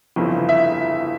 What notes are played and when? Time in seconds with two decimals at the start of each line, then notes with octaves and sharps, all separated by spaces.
0.16 G1 F2 C#3 E3
0.49 E5